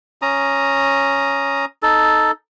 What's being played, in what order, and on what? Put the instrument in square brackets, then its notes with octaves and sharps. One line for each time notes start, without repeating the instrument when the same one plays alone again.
[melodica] C#4 A#5 D#6
D#4 A4